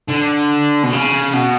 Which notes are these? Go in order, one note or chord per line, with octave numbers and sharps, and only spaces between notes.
D3
B2
C#3
B2